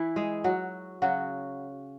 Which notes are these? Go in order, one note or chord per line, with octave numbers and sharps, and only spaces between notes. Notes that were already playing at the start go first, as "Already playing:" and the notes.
Already playing: E3 E4
G#3 G#4
F#3 F#4
C#3 F#3 F#4